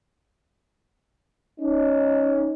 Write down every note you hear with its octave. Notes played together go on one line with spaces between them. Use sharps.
C#4 D#4